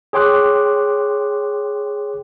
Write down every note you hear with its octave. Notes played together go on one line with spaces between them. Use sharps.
G#4 C#5 G5 C6 D6 F#6